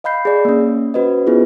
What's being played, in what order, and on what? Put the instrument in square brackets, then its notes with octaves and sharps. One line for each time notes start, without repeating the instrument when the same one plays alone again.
[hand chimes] D#5 F5 B5 G6 C7
G#4 D5
A#3 C#4
C#4 F#4 B4 C5 D#5
B3 E4 F4 G#4 B4